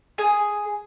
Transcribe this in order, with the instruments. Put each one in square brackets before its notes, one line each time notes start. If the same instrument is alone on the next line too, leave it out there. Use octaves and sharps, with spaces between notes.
[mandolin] G#4